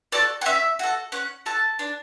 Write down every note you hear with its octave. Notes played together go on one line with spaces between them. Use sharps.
F#4 A4 D5
F#5
C#4 E5
F#4 A4
C#4 F#5
F#4 A4 A5
D4